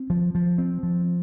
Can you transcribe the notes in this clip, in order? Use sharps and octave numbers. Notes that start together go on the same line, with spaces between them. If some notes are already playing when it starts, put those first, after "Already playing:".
Already playing: C4
F3
F3
C4
F3